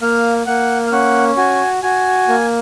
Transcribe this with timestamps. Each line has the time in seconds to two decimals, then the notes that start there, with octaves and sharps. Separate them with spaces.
0.02 A#3 F5
0.46 A#3 F#5
0.87 F5
0.92 C#4 F#5
1.37 F#4 G#5
1.83 F#4 G#5
2.28 A#3